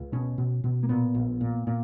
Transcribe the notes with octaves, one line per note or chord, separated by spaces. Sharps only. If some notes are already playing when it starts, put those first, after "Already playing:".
Already playing: C#2
B2 C#4
B2
B2
A#3
A#2 B3
A#1
A#2
A#2